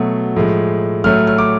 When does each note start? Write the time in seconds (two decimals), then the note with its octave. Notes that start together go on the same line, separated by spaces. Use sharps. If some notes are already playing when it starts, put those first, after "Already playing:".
Already playing: B2 F#3 A3
0.36 A2 F3 G#3
1.04 A2 F#3 A3 F6
1.27 F6
1.38 D6